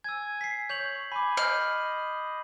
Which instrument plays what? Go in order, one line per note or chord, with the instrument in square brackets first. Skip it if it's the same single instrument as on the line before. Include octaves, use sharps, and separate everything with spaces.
[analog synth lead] G#5 [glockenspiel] E6 G#6
[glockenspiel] B6 C7
[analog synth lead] C#5 [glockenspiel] G6 F7 F#7
[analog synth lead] G#5 [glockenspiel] B5 D6
[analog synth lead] D#5 [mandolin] F6 [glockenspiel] G6 C7 F#7